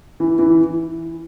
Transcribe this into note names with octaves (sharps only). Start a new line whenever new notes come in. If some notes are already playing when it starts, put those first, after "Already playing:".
E3
E3